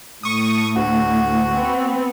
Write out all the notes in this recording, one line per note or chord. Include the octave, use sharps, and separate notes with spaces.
A2 C#6 D#6
D2 F#4
B3 C4